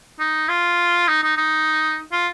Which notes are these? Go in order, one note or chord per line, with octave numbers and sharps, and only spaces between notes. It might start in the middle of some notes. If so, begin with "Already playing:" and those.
D#4
F4
D#4
D#4
D#4
F4